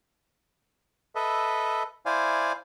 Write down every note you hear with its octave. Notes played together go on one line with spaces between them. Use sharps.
A4 B4 D#5 E5
E4 C5 D5 F5 G#5